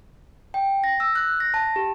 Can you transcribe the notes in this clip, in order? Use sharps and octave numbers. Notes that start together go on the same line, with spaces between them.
G5
A#6
E6
F#6
A#6
A5
G4